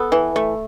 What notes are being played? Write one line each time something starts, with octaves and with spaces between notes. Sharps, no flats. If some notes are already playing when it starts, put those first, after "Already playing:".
Already playing: B3 A4
E3
A3